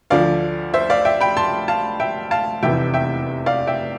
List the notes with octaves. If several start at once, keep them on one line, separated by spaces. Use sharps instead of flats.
D2 D3 F3 D5 F5
C5 E5
D5 F5
E5 G5
G5 B5
A5 C6
F5 A5
E5 G5
F5 A5
F1 E2 C3 E3 E5 G5
E5 G5
D5 F5
E5 G5